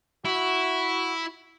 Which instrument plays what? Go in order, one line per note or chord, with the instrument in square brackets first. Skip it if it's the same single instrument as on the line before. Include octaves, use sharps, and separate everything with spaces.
[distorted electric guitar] E4 [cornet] F#4